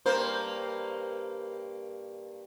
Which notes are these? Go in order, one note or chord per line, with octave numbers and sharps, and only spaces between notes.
G2 A#3 C5